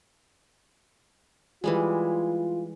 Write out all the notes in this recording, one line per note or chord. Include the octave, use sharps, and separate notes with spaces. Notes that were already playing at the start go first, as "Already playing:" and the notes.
E3 G3 G#3 F4